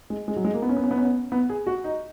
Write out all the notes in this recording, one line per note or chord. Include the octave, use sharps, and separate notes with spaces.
G#3
G#3
F#3
G#3
A#3
B3
C#4
B3
C#4
B3
C#4
B3
B3
G#4
F#4
D#4